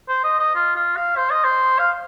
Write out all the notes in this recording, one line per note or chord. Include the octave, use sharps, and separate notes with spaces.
C5
D#5
D#5
F4
F4
F5
C5
D#5
C5
F5